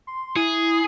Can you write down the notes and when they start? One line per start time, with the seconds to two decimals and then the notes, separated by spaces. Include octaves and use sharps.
0.07 C6
0.36 E4 G#4